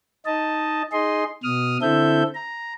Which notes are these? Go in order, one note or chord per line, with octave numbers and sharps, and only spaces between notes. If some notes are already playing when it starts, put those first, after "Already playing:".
D#4 D#5 A5
D#4 G#4 D#5 C6
B2 D#6 F6
D3 C4 E4 A4 E5 G6
A#5